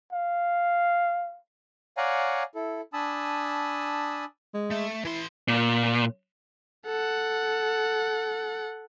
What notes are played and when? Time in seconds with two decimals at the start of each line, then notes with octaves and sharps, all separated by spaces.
0.12 F5
1.97 C#5 D5 F5 F#5 G#5 A#5
2.55 E4 A4
2.93 D4 G#5 A5 B5 D#6 E6
4.54 G#3
4.71 A3
5.05 E3 E4 C6
5.48 A#2
6.86 A4 F#5